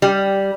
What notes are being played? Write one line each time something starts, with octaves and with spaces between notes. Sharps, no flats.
G3